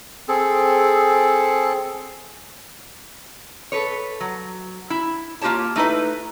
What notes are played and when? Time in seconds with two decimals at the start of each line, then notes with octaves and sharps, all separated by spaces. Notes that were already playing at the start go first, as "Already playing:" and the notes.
0.28 C4 G#4 A4
3.72 A4 B4 C#5
4.20 F#3
4.90 E4
5.41 A#3 F4 G4 C#5 A5
5.76 A3 D#4 E4 B4